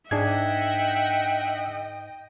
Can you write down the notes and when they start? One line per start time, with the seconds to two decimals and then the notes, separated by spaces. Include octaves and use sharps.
0.11 G#2 D4 G#4 D#5 E5 F#5 G5 G#6